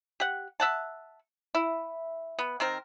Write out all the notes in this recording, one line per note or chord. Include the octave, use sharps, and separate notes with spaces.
G4 F#5
E5 F#5 A5
E4
B3
D#3 C4 A#4